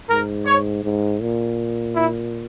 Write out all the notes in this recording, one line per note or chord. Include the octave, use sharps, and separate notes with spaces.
G#2 A#4
C#5
G#2
A#2
E4